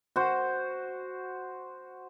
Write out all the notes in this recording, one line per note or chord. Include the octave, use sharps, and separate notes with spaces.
F#4 C5